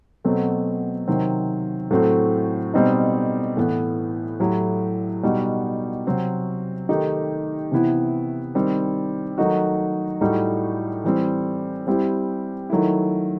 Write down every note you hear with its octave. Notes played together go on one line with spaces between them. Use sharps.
B2 F#3 A3 C4
C3 D#3 F#3 C4
A2 F#3 A3 C4 F#4
B2 G3 C4 D#4
A2 E3 B3
A2 F#3 A3 E4 G4
B2 G3 D#4 F#4
C3 F#3 C4 F#4
D#3 A3 D#4 G4
C3 E3 B3 E4
D#3 G3 C4
D#3 F#3 A3 D#4 F#4
A2 G3 D#4 F#4
E3 G3 C4
G3 C4 E4 G4
D#3 F#3 A3 E4